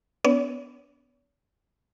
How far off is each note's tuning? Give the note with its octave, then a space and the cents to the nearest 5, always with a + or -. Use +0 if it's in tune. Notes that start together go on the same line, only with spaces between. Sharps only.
B3 +10 D4 -35 C#5 +45